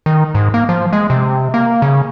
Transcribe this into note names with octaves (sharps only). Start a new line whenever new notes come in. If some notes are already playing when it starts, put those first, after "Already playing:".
D#3
G#2
A#3
F3
G#3
C3
A#3
C#3